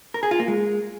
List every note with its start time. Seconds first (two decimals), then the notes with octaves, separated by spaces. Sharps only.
0.14 A#4
0.23 G#4
0.31 F4
0.40 A#3
0.48 G#3